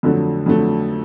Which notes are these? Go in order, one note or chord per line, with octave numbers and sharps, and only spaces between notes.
F2 D3 F#3 A3
F2 D3 F#3 A3